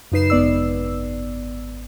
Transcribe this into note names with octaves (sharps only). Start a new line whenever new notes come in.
F#2 C#3 D#4 B4 C7 E7
G#1 B3 D5 E6